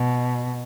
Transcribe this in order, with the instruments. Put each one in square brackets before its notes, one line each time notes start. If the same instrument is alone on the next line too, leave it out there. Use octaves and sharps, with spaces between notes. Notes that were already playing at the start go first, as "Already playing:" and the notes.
Already playing: [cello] B2